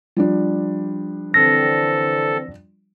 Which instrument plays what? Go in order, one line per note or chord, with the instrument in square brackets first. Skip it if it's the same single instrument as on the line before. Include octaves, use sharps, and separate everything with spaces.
[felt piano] F3 G3 D4
[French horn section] D3 E3 C4 [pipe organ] A4 [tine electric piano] A#6